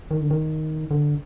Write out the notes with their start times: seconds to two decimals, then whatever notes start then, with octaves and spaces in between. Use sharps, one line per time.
0.11 D#3
0.21 D3
0.31 D#3
0.91 D3